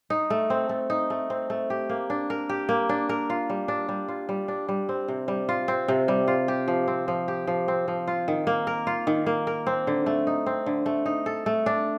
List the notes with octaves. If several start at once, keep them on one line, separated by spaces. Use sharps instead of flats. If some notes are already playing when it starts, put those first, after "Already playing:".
D#4
A3
C4
A3
D#4
A3
C4
A3
G4
A#3
D4
A#4
G4
A#3
D4
A#4
F4
G3
D4
G3
F4
G3
D4
G3
C4
C3
G3
F4
C4
C3
G3
F4
G4
F3
C4
F3
G4
F3
C4
F3
F4
D#3
A#3
A#4
F4
D#3
A#3
A#4
C4
D3
A3
D#4
C4
D3
A3
D#4
A4
A3
D4